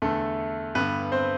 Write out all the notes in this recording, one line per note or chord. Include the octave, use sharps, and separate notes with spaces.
E2 D3 A3 A4
G2 D3 B3 B4
C4 C5